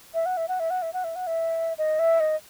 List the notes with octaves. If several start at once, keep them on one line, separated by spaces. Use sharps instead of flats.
E5
F#5
E5
F#5
E5
F#5
E5
F#5
E5
F#5
E5
D#5
E5
D#5